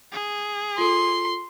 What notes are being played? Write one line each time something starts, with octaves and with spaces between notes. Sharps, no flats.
G#4
F4 A4 C6